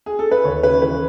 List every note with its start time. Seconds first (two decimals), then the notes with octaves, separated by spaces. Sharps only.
0.06 G#4
0.19 A4
0.31 B4
0.45 D#2 C#5
0.63 C#3 B4
0.82 E3 B4